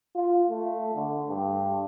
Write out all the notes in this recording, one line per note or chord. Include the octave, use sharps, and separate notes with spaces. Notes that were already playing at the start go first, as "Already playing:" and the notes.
F4
A3
D3
G2